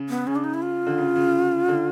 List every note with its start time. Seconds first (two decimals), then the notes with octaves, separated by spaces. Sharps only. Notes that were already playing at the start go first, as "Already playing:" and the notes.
Already playing: C#3
0.09 B3
0.27 C#3 C#4
0.36 D4
0.44 D#4
0.54 E4
0.62 F4
0.87 D3
0.98 C#3
1.16 C#3
1.69 D3